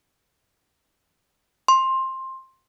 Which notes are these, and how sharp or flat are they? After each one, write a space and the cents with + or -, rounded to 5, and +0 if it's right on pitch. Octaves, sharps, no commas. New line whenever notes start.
C6 +15